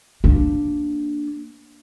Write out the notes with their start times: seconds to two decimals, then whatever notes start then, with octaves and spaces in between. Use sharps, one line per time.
0.24 A#3 D4